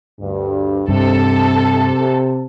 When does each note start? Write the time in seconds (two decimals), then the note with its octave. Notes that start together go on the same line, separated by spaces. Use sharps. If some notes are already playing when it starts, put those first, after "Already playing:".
0.19 D2 G2
0.88 G2 C3 A4